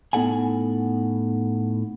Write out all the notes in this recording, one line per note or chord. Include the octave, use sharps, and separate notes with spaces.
A2 B3 D#4 A4 F#5 G#5